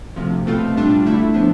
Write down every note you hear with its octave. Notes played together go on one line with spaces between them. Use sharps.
D2 C3 F3
B2 A3 C4 F4
A2 G3 D4 F4
D3 A3 E4
A2 F3 B3 D4